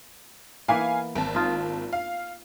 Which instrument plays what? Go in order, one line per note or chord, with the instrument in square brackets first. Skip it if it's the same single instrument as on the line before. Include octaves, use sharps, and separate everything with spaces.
[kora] E3 A#3 B3 [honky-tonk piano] F5 G#5
[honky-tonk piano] G#1 A5
[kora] D#4 F4
[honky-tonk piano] F5